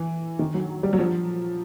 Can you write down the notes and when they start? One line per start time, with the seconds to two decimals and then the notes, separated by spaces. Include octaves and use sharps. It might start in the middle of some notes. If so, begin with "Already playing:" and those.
Already playing: E3
0.39 D#3
0.54 F#3
0.83 G3
0.93 F#3
0.99 F3